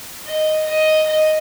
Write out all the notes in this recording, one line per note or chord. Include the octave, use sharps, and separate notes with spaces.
D#5
D#5
D#5